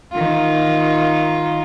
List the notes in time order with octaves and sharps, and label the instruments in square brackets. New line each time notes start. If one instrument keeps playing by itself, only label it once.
[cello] D#3 F4